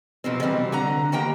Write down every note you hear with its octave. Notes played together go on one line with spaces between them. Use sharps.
F#2 B2 F3 C4
D3 E3 F#3 G3 C4
D3 F#5 A#5
D#3 G3 A#3 G5 A#5